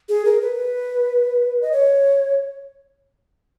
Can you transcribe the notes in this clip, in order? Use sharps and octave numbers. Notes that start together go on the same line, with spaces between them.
G#4
A#4
B4
D#5
C#5